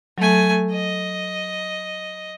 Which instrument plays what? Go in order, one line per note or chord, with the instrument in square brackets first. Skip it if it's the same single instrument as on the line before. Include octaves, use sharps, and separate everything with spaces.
[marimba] F#3 [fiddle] A3 G#5
[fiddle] D#5